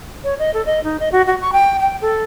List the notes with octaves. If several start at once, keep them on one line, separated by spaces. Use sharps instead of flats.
C#5
D#5
A4
D#5
D#4
D#5
F#4
F#4
C#6
G5
G5
A4